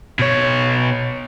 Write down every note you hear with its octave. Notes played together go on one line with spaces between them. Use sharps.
B2 C#5